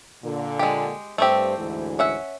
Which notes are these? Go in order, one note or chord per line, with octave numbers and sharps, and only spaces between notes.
A#2 D3
G#3 G4
G2 A3 C4 G4 C5
D2 G#2 E3
C#4 E5 F#5